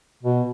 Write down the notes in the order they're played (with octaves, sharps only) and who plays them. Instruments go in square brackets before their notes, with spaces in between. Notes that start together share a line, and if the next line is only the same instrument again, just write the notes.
[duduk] B2